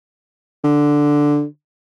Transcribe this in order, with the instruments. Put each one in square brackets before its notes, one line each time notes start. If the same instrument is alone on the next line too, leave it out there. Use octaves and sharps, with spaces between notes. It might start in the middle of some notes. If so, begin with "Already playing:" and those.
[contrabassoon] D3